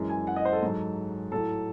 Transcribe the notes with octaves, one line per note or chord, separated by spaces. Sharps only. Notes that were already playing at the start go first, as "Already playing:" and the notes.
Already playing: F#2 E3 G#3
G#5
F#5
D#5
C5
A4
G#2 F#3
A2 F#3 A4